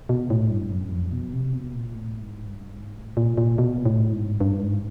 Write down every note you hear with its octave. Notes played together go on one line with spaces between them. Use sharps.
B2
A2
G2
F#2
F2
B2
C3
B2
A#2
A2
G#2
G2
G#2
A2
A#2
A#2
B2
A2
G#2
G2
G#2